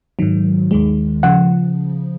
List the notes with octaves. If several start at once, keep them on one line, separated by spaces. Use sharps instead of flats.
G#2 D#3 F#3
D#2 D#3 G#3
C#3 F3 F#5